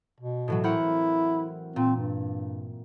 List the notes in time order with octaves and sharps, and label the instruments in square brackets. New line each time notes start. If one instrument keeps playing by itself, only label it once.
[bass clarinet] B2
[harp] A2 E3 F#3
[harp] C4 A#4 F#5 [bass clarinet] E4
[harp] A#2 [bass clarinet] C4
[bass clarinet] G2